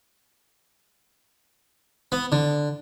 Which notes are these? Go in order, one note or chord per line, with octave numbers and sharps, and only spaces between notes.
B3
D3